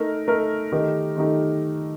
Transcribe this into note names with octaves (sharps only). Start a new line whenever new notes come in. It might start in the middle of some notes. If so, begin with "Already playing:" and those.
Already playing: A3 D#4 A#4
A3 D#4 A#4
D#3 A3 D#4 G4 A#4
D#3 A3 D#4 G4